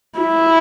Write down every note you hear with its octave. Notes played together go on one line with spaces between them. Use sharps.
E4